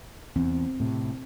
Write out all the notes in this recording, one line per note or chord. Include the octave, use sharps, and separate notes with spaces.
E2 C4
A2 C3